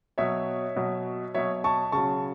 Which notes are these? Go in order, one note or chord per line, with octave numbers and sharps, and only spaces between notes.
B2 F#3 C#5 E5
B2 F#3
B2 F#3 C#5 E5
A5 C#6
C#3 F#3 A5 C#6